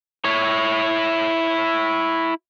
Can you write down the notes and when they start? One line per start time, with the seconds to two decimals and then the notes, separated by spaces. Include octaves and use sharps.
0.25 E4 C#5